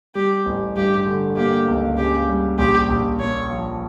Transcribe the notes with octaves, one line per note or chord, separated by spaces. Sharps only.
G3 G4
A1
G2 G4
D3
A#3 G4
C#2
C#3 G4
G3
A#1 G4
A#1
A#2 C#5
F3